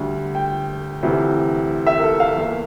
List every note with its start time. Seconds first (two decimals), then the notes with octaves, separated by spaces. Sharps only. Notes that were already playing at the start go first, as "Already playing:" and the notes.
Already playing: D2 D3 G3
0.35 G5
1.03 D2 C3 E3
1.87 E5
1.99 A#4
2.03 A4
2.20 F5
2.37 E2 E3 A#3